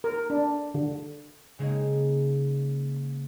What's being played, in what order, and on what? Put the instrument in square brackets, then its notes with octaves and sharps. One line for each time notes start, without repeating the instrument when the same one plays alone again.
[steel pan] A#4
D4
D3
[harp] C#3 G#3 A#3 C4 D#4